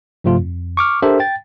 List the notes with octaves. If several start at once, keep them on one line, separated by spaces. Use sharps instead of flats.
G2 C3 F3 A3 F4
F2
C#6 D6 F6
D4 G4 A4 A#4 C5 E5
G5 A6